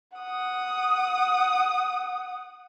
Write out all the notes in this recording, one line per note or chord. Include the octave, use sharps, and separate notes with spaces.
F#5 D#6